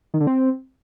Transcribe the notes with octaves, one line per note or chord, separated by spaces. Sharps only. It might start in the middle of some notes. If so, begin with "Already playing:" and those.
D#3
D3
C4